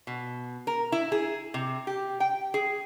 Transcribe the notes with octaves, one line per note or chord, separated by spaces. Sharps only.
B2
A#4
E4
G#4
C3
G4
G5
G#4